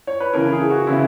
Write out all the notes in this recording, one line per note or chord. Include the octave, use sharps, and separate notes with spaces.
C#5
B4
C#3 E3 A#4
G#4
F#4
C#3 E3 E4